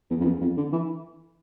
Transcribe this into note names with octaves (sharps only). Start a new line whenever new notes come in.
E2
F2
E2
F2
D3
E3